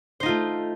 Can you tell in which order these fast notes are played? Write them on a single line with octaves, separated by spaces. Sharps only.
C5 D#4 F4 A3